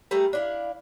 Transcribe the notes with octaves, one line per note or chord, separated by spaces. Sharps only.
G3 A3 G#4 A#4
D4 E4 F5